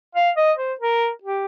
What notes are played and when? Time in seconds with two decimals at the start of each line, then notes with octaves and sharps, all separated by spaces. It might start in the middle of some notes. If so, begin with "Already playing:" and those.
0.15 F5
0.37 D#5
0.58 C5
0.81 A#4
1.23 G4